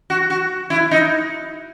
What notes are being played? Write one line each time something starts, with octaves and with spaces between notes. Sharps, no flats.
F#4
F#4
E4
D#4